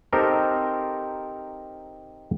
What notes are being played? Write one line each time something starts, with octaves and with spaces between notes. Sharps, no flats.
C4 D#4 G4 A4 A#4 C5